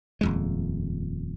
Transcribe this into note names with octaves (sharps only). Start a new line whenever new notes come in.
D#1 F2 G#3